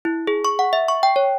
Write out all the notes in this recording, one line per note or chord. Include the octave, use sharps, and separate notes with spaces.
E4
G#4
C#6
F#5
E5
C#6
G5
C#5